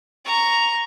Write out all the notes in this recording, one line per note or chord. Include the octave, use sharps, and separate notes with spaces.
A#5 C#6